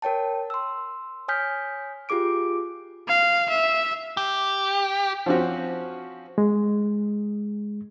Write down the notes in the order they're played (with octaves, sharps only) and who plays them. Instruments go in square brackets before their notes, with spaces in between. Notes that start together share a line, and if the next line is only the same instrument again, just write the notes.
[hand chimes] A#4 C#5 G5 A5
C6 E6
C#5 G#5 D#6 F6 G6 B6
F4 G4 G#4 D6 D7
[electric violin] F5
E5
[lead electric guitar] G4
[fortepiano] F3 C4 C#4 F#4
[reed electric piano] G#3